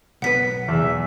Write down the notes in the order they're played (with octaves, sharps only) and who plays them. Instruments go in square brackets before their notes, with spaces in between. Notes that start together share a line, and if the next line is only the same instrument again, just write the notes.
[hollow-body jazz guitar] B1 B2 B4 [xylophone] F#5 B6
[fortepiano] E2 [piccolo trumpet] E5